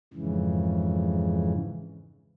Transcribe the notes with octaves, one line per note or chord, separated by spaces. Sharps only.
F2 G#2 C#3 E3